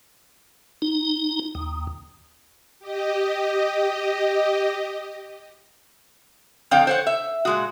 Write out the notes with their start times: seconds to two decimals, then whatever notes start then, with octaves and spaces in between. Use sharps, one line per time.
0.82 D#4
1.55 D#2
2.79 G4 D#5
6.71 F2 D3 C#5 F5 G5
6.87 C5 C#5 F#5
7.07 E5
7.45 A#2 G#3 F#4